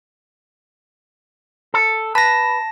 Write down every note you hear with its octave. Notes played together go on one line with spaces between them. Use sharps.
A4
B4 A5 A#6